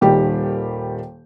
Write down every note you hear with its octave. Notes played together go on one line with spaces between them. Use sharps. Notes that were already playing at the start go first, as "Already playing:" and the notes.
D#1 D#3 G3 G4